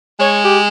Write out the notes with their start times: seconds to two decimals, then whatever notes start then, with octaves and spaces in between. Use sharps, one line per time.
0.20 G#3 C#5
0.41 G4